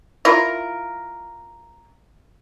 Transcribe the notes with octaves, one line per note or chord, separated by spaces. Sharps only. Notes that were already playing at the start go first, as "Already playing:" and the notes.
E4 F4 A#4